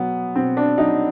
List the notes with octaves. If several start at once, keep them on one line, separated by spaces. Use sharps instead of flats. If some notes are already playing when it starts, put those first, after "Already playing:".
Already playing: B2 F#3 B3
B2 C4
D4
F#3 D#4